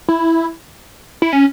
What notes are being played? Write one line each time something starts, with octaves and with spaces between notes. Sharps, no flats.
E4
E4
C#4